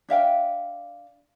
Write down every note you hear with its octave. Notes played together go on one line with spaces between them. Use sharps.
D4 E5 F5 G5